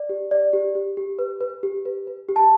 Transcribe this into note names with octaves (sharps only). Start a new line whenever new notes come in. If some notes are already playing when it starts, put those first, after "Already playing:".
Already playing: D5
G4
D5
G4
G4
G4
B4
B4
G4
B4
B4
G4
A5